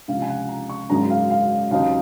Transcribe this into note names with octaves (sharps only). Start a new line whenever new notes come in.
C#2 C3 F3 F5
G#5
F#5
A#5
C#6
G#1 F#2 C#3 G#3 A#5
F5
F5
D#2 C#3 F#3 C4 D#4 F5